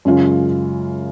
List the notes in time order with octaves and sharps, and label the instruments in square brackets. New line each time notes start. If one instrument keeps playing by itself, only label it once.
[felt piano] F#2 C#3 G#3 C#4 F4